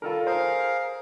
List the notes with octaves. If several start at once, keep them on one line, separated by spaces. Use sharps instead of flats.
D#3 G3 F4 A4 A#4
G#4 A#4 C5 F5